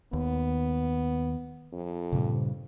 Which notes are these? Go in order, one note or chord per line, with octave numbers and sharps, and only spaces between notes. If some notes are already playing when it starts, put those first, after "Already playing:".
D#2 B3
F2
G2 A#2 C#3